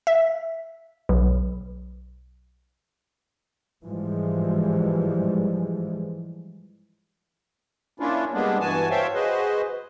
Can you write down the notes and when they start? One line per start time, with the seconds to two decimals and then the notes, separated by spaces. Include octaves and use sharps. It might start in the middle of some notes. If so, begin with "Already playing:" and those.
0.07 E5
1.09 B1
3.84 G#2 E3 F3 G3 G#3
8.00 A#3 C#4 D4 E4 F4
8.34 G3 G#3 A#3 B3 D4
8.60 G2 E3 F#4 G#5 A5
8.91 C5 C#5 E5 F5 G5 A5
9.14 F#4 G#4 B4 C5 D#5